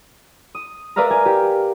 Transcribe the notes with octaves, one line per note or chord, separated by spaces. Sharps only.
D#6
A#4 B4 D5 E5 F5 A#5
F5 G#5
G4